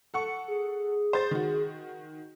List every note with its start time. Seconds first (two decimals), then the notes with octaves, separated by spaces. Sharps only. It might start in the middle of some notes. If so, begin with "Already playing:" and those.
0.14 A4 F#5 C#6 C#7
0.48 G#4
1.13 C5 A6
1.31 D#3 F#4